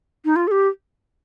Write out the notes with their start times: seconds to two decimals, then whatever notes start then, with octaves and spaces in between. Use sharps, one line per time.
0.25 D#4
0.36 F4
0.47 A4
0.51 G4